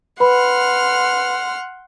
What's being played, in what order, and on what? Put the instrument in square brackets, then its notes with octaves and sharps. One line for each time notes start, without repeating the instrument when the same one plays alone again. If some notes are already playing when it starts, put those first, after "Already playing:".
[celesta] B4 B5 [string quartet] F#5 C6 F6